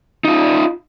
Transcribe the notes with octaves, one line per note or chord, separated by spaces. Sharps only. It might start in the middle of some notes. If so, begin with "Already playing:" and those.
D#4 F4